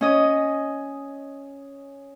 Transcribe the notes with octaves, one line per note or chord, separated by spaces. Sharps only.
C#4 D#5